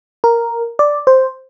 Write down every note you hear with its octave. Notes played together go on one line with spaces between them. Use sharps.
A#4
D5
C5